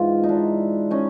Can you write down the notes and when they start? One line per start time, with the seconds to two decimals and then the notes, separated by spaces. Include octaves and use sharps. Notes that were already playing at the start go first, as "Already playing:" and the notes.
Already playing: G#2 E3 F4
0.23 D#4
0.29 D4 E4
0.91 C#4 D#4